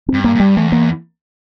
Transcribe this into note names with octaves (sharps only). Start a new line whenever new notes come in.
G2 C4
A#3
G2 G3
E2 A3
A#3